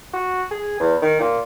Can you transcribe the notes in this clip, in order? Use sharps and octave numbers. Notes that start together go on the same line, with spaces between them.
F#4
G#4
E2
D#3
A#2